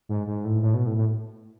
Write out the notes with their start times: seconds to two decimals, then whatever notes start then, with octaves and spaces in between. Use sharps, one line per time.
0.09 G#2
0.27 G#2
0.45 A2
0.63 A2
0.74 B2
0.86 A2
0.97 A2